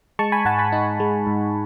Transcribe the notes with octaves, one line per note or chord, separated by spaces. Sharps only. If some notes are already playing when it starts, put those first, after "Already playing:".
G#3 A5 C#6
G#5 B5
G#2 F#5 A5
G#5 B5
D#4
G#3
G#2